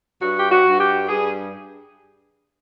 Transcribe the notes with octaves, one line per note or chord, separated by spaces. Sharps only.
G2 F#4
G4
F#4
G2
G4
G2 G#4